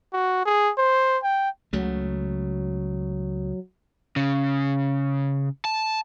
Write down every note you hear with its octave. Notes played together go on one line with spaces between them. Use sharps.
F#4
G#4
C5
G5
C#2 C#3 F#3 A3
C#3
A5